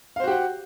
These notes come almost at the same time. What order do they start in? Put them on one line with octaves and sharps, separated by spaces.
F5 C5 F#4 G4 F#5